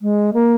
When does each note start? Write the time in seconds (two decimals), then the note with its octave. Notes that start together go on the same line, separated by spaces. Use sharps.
0.02 G#3
0.34 A#3